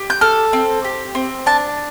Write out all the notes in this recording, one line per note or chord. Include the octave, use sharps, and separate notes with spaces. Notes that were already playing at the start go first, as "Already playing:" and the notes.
Already playing: G4
G6
A4 F6
C4
G4
C4
D4 A5